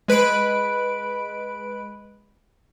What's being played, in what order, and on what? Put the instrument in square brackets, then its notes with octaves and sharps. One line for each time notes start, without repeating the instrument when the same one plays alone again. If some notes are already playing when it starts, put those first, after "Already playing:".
[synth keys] G#3 B4 B5 D7